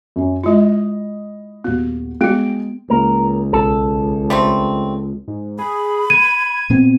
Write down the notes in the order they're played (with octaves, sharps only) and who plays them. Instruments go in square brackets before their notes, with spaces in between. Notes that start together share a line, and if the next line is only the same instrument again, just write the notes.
[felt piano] F#2 C#4
[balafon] G#3 F4 [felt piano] E4 D#5
[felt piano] D#1 F#4 [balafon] B3
[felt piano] G#3 G5 D7 [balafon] B3 F#4
[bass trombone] C#2 [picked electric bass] A#3 [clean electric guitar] A#4
[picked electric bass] B1 [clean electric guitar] A4
[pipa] G3 A3 C4
[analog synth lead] G#2
[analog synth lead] G#4 [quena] B5
[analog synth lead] G#6 [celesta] D#7
[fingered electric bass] A#2 B3 C4